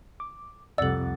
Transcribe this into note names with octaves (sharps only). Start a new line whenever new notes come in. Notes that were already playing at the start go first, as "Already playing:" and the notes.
D6
C2 F2 C3 A4 D5 F#5 E6 A6